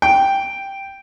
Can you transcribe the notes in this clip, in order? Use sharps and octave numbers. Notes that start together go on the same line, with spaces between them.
G5